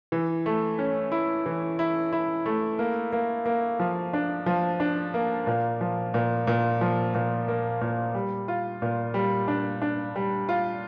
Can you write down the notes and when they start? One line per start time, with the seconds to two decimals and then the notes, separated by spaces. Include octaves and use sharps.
0.12 E3
0.46 A3
0.79 C#4
1.12 E4
1.46 E3
1.79 E4
2.13 E4
2.46 A3
2.79 A#3
3.13 A#3
3.46 A#3
3.80 F3
4.13 D4
4.46 F3
4.80 D4
5.14 A#3
5.47 A#2
5.81 F3
6.14 A#2
6.47 A#2
6.81 F3
7.14 A#2
7.48 A#3
7.81 A#2
8.15 G3
8.48 F4
8.82 A#2
9.14 G3
9.48 D4
9.82 D4
10.16 G3
10.49 F4